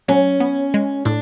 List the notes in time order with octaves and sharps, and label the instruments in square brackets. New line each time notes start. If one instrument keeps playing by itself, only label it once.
[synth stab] F#3 [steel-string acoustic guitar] C#4
[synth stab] B3
G#3
[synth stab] A2 [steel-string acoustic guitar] D4